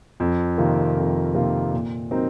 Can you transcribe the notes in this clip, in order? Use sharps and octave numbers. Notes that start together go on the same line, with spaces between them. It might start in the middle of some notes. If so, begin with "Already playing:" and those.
F2
C3 D#3 A#3 F4
F2
C3 D#3 A#3 F4
A#2
F#3 C4 D#4 A#4